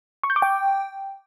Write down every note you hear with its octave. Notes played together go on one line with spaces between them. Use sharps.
C#6
G6
D6
G5